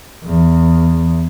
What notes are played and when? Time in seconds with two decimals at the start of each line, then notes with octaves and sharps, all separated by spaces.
0.24 E2